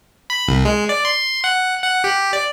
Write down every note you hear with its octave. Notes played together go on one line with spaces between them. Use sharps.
B5
C2
G#3
D5
C6
F#5
F#5
G4
D5